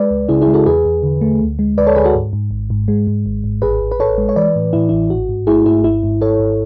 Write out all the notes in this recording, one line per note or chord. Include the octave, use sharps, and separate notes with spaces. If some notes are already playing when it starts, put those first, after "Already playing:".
Already playing: G#3 B4 D5
C#2
C#3 E4 G#4
E4 G#4
G#3
F#4 A4
E2 G#4 B4
E2
D3
A3
D2
G#3
D2 B4 D5
A4 C#5
D2 G#4 B4
F#4 A4
G#2
G#2
G#1
G#2
G#3
G#2
G#1
G#1
A1 G#4 B4
A1
B4
A1 A4 C#5
G#3
C#5
E3 B4 D5
A2
A2 E4
A1 E4
G#1 F#4
G#2
A3 E4 G#4
G#2 E4 G#4
G#1 E4
G#2
G#1 A4 C#5
G#1